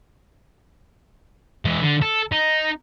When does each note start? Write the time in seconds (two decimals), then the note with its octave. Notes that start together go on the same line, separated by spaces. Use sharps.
1.65 E3 G#3
1.82 D3
2.02 A4
2.32 D#4